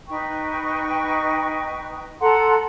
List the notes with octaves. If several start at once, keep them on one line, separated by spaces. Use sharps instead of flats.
D#4 B4 G5 C#6
A4 F#5 A#5 C6